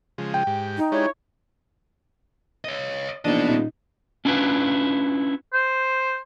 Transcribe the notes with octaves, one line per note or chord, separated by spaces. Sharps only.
C#3 F3 G#3
G5
G#2 G4
D#4
G#3 D4 E4 G4 C#5
C#5 D#5
A#1 E3 B3 D4 D#4 D#5
D#1 A#2 D#4
C#4 D4 E4 F4 B4
C5